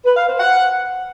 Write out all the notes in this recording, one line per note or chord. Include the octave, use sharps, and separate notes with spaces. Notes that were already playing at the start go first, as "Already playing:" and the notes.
B4
F5
C5
F#5